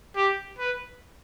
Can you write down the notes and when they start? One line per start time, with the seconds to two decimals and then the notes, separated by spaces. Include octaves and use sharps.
0.16 G4
0.58 B4